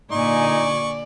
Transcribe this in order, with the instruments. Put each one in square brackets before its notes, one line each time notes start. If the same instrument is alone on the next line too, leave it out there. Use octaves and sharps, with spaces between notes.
[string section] A#2 D3 G#5 [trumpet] D#4 [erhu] D5 [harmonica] C#6